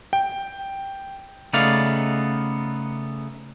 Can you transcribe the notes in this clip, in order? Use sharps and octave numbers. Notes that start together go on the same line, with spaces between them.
G5
C#3 A3 B3 D#4 D5 F5